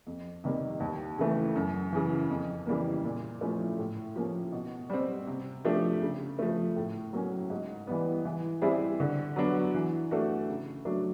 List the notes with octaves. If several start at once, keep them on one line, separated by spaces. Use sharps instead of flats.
F2
C3 D#3 G3 A#3
D#2
C#3 E3 A3
F#2
C#3 E3
F2
C#3 E3 G3 A#3
A#2
F3 A3 C#4 E4
A2
F3 A#3 C#4
B2
G3 C4
C3
F3 A3 D4 G4
C#3
F3 A3
A2
F#3 A#3 C#4
G#2
E3 G3 B3
E3
G3 C4 E4 G#4
D3
F#3 B3 D4 F#4
E3
A3 D4 F#4 A4
C#3
F#3 A3 D4 F#4